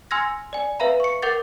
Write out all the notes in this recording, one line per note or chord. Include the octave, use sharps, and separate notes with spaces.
G#5 C6 E6 F6 G#6 A#6
D5 G#5
B4 E5 F5 A#5 B5
C#6 C#7
A#4 F#5 D6 G6 A6